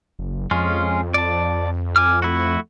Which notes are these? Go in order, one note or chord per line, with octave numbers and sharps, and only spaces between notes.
F#1
F2 G#3 C#4 F4
D5 A5
G#5 D6 F6
A3 E4 F#4